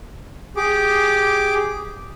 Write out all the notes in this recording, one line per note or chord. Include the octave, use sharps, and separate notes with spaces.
G4 G#4 D6